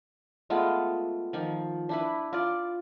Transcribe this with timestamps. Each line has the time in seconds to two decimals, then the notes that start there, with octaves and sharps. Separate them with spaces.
0.50 G#3 A3 B3 F4
1.33 D#3 F3
1.89 D4 E4 B4
2.33 F4 D5